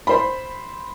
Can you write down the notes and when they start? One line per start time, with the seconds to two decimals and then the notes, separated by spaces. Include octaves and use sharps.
0.07 C5 B5